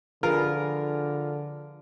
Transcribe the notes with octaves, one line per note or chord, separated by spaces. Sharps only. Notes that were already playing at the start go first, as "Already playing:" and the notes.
D3 F3 F4 G#4 A#4 B4